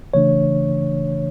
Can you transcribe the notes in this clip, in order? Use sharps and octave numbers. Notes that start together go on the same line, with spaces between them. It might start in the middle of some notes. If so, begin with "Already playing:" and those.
C#3 E3 A3 D4 C#5